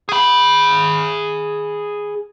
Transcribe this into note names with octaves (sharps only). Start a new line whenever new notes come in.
G#4 B5